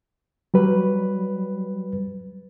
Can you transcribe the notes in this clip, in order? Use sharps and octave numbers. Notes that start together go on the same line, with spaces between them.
F#3 G3 B4